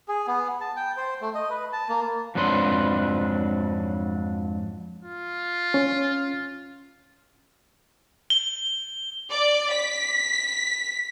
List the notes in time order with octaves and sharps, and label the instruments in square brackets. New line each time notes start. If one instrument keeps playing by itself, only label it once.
[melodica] G#4
B3
A5
G5
C5
A3
D#5
B4
A5
A#3
[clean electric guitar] F2 G#2 F#3 D4 B4 C6
[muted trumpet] F4
[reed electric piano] C#4
[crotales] G7
[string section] D5
B6